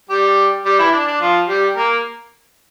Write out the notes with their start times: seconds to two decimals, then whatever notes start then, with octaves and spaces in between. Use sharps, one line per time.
0.09 G3 G4
0.65 G3 G4
0.79 E3 E4
0.93 D4
1.07 D4
1.21 F3 F4
1.48 G3 G4
1.76 A#3 A#4